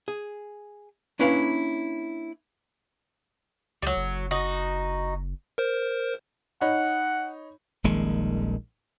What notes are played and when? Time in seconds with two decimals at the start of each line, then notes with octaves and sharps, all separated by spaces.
0.08 G#4
1.19 A#3 C#4 D4 E4 B4 F5
3.82 C#2 F#3 G3
3.96 F#1
4.31 D#4 F#4
5.58 A#4 C5
6.61 D#4 C#5 F#5 B5
7.84 D#1 A#1 D#3 G#3